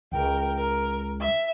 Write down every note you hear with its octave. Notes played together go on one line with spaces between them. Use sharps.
C#2 A#4 G5
A#4
E5